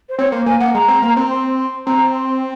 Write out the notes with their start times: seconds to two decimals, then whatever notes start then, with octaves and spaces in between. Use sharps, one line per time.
0.09 C5
0.18 C4 C#5
0.32 A#3 C5
0.46 A#3 G#5
0.60 A#3 F#5
0.74 G#3 A#5
0.88 C4
1.02 A#3
1.17 C4
1.30 C6
1.86 C4 A#5
2.14 C6